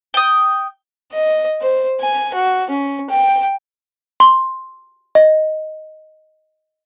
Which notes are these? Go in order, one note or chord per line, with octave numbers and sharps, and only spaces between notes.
G5 D#6
D#5
C5
G#5
F#4
C#4
G5
C6
D#5